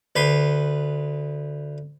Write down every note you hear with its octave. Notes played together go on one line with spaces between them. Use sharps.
D2 B4 C6